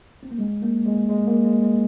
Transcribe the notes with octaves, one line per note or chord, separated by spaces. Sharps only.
C4
A#3
G#3
A#3
G#3
G#3
A#3
G#3
G#3